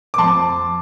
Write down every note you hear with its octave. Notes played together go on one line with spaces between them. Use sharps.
D6
F2 A5 C6